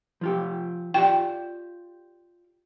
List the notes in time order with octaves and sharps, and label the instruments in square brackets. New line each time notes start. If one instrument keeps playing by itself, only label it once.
[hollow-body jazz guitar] F3 F4 G4
[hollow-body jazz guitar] F4 G4 D5 [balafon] G5